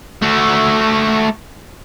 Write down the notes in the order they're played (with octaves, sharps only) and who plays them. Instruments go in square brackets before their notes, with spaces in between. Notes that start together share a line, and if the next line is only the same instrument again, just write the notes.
[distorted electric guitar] A3 F#4